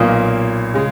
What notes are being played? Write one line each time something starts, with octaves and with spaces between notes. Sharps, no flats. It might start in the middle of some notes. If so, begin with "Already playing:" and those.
Already playing: B1 A#2 A#3 D#6
C#3 G#3